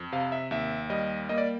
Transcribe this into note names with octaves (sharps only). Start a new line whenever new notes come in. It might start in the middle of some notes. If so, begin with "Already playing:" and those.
Already playing: F2
C3 F5
E5
D#2 E5
G3 D#5
A#3 D#5
D5